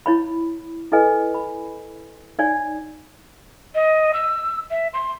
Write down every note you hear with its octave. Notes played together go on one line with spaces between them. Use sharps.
E4 C#5 B5
E4 A4 B4 D#5 G#5
B5
D#4 C#5 D5 G#5
D#5
E6
E5
C6